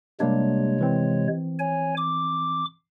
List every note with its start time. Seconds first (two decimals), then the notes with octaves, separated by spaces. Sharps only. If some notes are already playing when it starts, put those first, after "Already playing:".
0.20 C3 G3 G#3 A#3 D4 C#5
0.81 E3 C4
1.59 C#5 G#5
1.97 D6